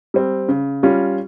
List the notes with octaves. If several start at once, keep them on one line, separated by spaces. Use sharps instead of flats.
G3 C4
C#3
G3 C#4 F4